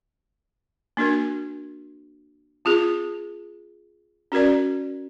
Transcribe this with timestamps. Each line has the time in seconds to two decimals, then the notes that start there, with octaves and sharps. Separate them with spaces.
0.97 A#3 D4 F#4 A#4
2.65 C4 F4 G#4
4.32 C#4 F#4 A#4 D5